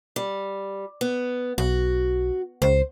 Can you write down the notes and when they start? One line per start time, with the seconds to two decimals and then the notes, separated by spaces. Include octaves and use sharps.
0.16 G3
1.01 B3
1.58 B1 F#4
2.62 C#2 C5